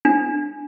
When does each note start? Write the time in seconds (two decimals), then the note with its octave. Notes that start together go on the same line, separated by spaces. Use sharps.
0.05 D4